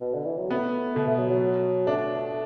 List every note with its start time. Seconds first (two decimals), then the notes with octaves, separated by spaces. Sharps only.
0.01 B2
0.13 D3
0.26 E3
0.38 F#3
0.50 A3 B3
0.95 B2 A3
1.07 A3
1.18 F#3
1.30 F#3
1.86 A3 D4